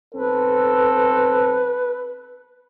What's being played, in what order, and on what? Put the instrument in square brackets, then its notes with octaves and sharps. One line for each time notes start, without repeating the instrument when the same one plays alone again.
[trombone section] B1 C4 A4 [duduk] B4